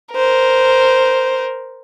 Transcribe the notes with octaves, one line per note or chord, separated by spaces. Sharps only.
A#4 C5